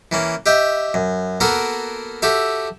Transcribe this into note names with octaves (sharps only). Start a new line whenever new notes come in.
E3 A#3 C#4
G4 D#5 E5 G5
F#2
A#3 B3 F#4 A4 A#4
F#4 G4 A4 E5